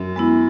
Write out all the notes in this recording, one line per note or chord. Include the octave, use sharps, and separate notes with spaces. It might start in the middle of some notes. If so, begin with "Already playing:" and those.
Already playing: F#2
G#3 B3 E4